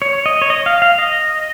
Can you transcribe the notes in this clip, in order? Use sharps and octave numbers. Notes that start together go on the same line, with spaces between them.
C#5
D#5
C#5
D#5
F5
F5
D#5